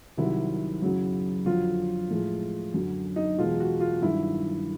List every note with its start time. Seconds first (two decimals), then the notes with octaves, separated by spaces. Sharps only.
0.18 C2 C3 D#3 F#3 E4
0.82 F#2 C#3 F#3
1.46 F2 D3 F#3 F4
2.10 A2 F3 G#3
2.74 F#2 D3 F#3
3.16 D#4
3.38 E2 B2 G#3 F4
3.60 F#4
3.80 F4
4.02 G2 D#3 F#3 E4